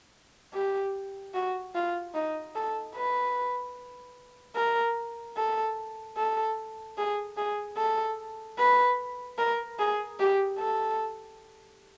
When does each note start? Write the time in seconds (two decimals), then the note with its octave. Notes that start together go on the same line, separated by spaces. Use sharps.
0.54 G4
1.34 F#4
1.75 F4
2.14 D#4
2.55 A4
2.96 B4
4.56 A#4
5.37 A4
6.17 A4
6.98 G#4
7.37 G#4
7.77 A4
8.58 B4
9.38 A#4
9.79 G#4
10.19 G4
10.59 A4